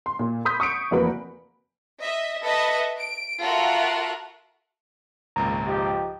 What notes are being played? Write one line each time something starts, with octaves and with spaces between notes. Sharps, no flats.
C6
A#2
B5 C6 D#6 G6 B6
C#6 D#6 C#7 D7
F1 E3 A#3 F#4 B4 B5
D#5 E5
A4 B4 D#5 E5
D7
F4 F#4 A4 A#4 E5 F#5
G#1 C#2 A#2 A#5
F3 D#4 G4